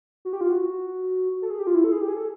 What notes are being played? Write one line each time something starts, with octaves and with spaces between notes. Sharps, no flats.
F#4
G4
F4
F#4
A4
G#4
G4
F4
E4
A4
G#4
G4
G#4
A4